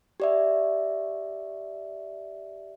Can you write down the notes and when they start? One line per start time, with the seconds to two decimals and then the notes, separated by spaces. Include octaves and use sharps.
0.20 G4 D5 E5